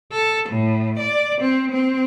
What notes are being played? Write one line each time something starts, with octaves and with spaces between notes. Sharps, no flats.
A4
A2
D5
C4
C4